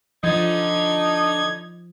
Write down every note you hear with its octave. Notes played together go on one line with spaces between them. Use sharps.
D3 F3 D#4 G#6